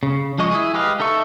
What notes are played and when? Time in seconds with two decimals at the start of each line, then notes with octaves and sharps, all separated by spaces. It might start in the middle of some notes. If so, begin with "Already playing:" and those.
0.03 C#3
0.38 F3 G#3 D#5 C#6
0.51 E4 G#4
0.74 G#3 G4 B4 D#5 F5
1.00 D#4 A4 E5 C#6